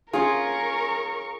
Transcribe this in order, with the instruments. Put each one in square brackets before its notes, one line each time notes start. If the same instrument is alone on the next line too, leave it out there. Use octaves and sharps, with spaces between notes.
[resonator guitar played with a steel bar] C#4 F4 [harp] G#4 [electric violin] A#4 C#6